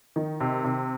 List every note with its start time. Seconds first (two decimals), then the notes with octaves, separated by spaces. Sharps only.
0.16 D#3
0.40 C3
0.64 C3